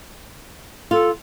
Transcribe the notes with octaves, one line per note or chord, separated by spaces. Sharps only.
F4 A4